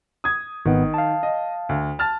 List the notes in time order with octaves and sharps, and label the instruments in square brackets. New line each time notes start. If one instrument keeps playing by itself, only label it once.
[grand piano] D#6 G#6
[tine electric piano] G#1 B3 [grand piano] D#3
[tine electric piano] F5 A5
[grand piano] D#5
D2
A5 F6 A6